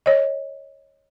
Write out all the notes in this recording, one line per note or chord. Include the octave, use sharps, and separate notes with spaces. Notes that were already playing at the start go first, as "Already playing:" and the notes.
C#5 D#5